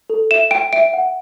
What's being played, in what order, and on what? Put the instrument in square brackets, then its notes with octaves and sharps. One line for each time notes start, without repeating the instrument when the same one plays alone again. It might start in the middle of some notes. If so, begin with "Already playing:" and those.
[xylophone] A4
E5 E7
G5 D7
E5 D7
F#5